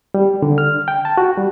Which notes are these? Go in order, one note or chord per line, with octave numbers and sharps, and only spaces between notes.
G3
D3
F6
G5
A5
F#4
G3